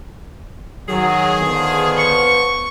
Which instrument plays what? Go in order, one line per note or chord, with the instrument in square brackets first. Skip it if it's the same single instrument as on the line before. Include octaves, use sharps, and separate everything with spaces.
[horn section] D#3 G#4 [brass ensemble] F#3
[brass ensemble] D3 F3 B3
[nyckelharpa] C#6